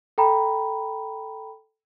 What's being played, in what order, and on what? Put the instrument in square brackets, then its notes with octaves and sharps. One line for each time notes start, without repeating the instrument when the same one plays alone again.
[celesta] A4 G5 A#5 B5